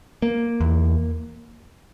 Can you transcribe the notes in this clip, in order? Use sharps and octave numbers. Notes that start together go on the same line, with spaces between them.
A#3
E2